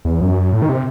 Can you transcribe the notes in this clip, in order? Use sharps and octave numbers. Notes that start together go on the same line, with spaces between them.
E2
F#2
A2
D#3
C3